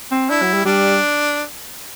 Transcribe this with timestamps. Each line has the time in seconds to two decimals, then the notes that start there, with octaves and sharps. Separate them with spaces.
0.11 C4
0.30 D4 E4
0.42 F#3
0.54 G3
0.65 G3 D4